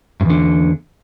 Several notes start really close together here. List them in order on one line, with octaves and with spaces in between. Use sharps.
G2 E2 D3